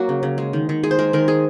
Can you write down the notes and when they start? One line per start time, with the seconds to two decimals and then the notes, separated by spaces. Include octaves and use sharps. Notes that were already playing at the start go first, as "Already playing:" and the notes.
Already playing: F#3 A#3 F#4
0.09 C#3
0.23 C#3
0.38 G#3
0.53 D#3
0.69 D#3
0.83 G#3 G#4
0.91 C5
0.99 G#3 A#4
1.13 D#3 A#4
1.28 G#3 G#4